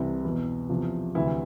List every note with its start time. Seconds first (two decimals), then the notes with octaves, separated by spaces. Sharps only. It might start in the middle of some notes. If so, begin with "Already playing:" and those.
Already playing: C2 C3 E3
0.25 E2 B2
0.69 E2 C3 F3
1.15 D2 C3 E3 E4